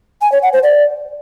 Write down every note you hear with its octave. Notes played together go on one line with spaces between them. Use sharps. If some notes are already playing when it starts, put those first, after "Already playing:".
G#5
C#5
F#5
C5
D5